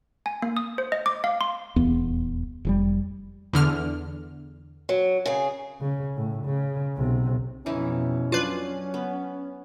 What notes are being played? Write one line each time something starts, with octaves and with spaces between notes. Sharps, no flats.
G#5
A#3
D#6
C5
D#5
D6
F5
C6
D#1 E2 B3
F1 C#3 G3
E2 D3 F6
F#3
C#3 G#4
C#3
A2
C#3
B1 C3
F2 B2 E3 C#4 D#4 E4
F#3 D4 F4 B4
B3